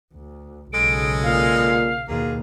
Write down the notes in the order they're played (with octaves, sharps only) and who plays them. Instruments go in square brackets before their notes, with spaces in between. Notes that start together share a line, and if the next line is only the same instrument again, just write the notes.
[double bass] D2
[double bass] B1 C#3 [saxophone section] G#3 G#4 A4 [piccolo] D7
[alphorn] A#2 [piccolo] F5
[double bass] D#2 B2 [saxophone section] A#3 F4 G#4